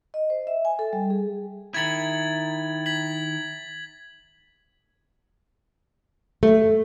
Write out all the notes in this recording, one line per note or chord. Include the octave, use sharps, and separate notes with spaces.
D#5
C5
E5
G#5
A4
G3
G#4
D#3 E4 G#6 A6 F#7
G#6 B6 F#7
A3